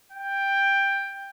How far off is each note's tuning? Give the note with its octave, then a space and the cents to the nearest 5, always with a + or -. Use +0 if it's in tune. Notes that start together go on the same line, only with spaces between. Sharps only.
G5 +10